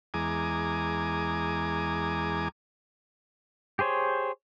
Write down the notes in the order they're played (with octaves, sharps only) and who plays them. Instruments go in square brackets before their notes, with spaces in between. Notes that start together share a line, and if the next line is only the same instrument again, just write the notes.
[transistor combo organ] E2 G#3 G#5 A#5 D6 D#6
[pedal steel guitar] G4 G#4 C5 C#5